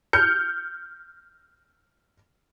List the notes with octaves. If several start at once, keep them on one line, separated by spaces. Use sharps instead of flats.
F6 G6 C#7